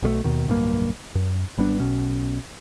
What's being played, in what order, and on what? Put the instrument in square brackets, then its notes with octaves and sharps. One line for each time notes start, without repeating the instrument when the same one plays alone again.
[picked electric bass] B1 B2 G3 A3
D#2 B2 D#3
D1 B1 G2 A#3
F#2
G#1 G3 B3 D4
B1 B2 C#4